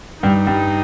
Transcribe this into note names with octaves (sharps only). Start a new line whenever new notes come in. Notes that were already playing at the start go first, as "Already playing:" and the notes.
G2 G3 D#4
G2 G3